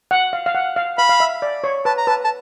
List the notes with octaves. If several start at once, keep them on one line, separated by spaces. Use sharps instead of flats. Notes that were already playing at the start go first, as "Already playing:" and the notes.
F#5
F5
F5
F#5
F5
F5 B5
F5
E5
D5
C#5
B4 A5
A#5
B4 A5
A5